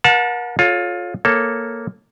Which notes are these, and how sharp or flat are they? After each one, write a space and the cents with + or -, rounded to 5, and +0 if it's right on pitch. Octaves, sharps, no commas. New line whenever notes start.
A#4 +40 F#5 -35 A5 +0
F4 +20 A4 -20 C#5 +0
A#3 +0 A4 +0 C#5 +0